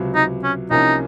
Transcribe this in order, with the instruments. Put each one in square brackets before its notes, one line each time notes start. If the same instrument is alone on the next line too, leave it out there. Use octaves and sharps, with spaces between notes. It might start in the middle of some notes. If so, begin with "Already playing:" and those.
Already playing: [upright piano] C#2 C3 F#3
[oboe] D#4
C#4
[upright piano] C2 C3 F3 A#3 C#4 [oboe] D#4